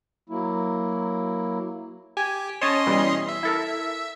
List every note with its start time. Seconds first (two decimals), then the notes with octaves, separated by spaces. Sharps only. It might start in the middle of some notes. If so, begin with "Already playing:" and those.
0.30 F#3 A#3 E4
2.17 G4 G#5
2.61 C#4 C#5 D#5 A5 C6 D#6
2.87 B2 E3 G3
3.29 E5
3.43 E4 A4 A#4